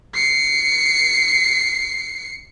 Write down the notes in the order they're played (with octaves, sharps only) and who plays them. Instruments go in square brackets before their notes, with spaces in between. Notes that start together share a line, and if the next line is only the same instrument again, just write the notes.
[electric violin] C7 C#7